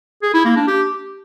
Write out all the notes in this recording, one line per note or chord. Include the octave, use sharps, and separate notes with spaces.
G#4
E4
A#3
D4
G4